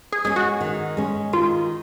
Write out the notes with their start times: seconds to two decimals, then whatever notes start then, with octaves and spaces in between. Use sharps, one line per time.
0.12 G#4
0.25 G#3 C#4 G#4
0.36 F#4
0.61 D#3
0.97 G#3 C#4
1.33 D#3 F4